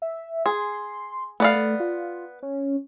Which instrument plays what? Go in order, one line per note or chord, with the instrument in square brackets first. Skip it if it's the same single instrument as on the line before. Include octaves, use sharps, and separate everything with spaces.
[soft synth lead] E5
[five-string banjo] G#4 [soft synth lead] C6
[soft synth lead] A3 [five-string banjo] B3 D5 F5
[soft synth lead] A3
F4
C#4